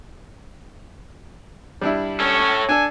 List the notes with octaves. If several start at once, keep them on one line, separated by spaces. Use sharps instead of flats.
G3 D4 E4
C#4 A4 C#5
D4 A4 G#5